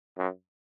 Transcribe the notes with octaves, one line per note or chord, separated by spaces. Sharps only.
F#2